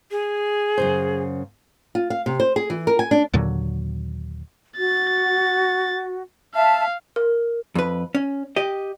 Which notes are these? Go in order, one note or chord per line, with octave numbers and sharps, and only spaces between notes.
G#4
F#2 C#3 C5
F4
F5
C3
C5
G#4
E3
A#4
G#5
D4
D#2 A#2 D3 F#3
F#4 A6
E5 F5 A5
A#4
F2 B4
C#4
G4 D#5